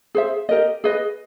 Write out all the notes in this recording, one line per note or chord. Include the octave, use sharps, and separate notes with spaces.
G#4 C5 E5
G4 A#4 D#5
G#4 B4 D#5